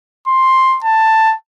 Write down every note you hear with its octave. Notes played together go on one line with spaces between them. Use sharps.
C6
A5